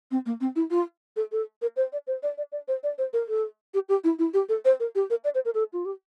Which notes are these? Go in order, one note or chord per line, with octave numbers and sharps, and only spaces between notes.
C4
A#3
C4
E4
F4
A4
A4
A#4
C5
D5
C5
D5
D5
D5
C5
D5
C5
A#4
A4
G4
G4
E4
E4
G4
A4
C5
A#4
G4
A#4
D5
C5
A#4
A4
F4
G4